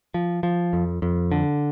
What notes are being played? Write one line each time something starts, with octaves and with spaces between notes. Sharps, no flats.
F3
F3
F2
F2
D3